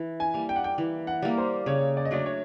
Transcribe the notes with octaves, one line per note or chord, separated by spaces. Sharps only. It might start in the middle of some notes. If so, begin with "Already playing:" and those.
Already playing: E3
G#5
G3 A#3
G5
F#5
G5
E3
F#5
G3 A#3
C5
C#3 C#5
D5
D#5
F#3 A3 D4 D5
C#5